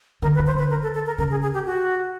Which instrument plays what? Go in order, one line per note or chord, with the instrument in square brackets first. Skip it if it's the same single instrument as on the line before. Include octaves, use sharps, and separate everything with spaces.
[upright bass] D3 [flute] A#4
[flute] B4
[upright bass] D3
[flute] C5
[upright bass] D3 [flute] B4
[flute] A#4
A4
A4
A#4
[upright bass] C#3 [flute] A#4
[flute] G#4
G#4
G4
F#4